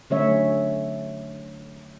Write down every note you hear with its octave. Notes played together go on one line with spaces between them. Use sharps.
D3 F#3 A3 C#4 C#5 E5